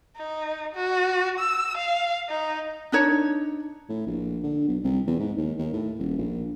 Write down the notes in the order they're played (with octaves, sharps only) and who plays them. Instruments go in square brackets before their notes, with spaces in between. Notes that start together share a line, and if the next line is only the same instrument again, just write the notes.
[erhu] D#4
F#4
E6
F5
D#4
[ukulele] D4 D#4 C#5
[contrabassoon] A2
A#1
D3
B1
C2
E2
G#2
D#2
D#2
A2
D#1
A#1